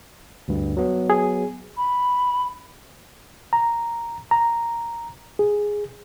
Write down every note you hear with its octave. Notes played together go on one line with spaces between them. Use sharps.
D2 G2
F#3 B3
G#4
B5
A#5
A#5
G#4